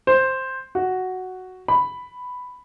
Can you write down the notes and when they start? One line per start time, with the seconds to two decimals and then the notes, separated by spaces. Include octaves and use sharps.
0.07 C5
0.75 F#4
1.68 B5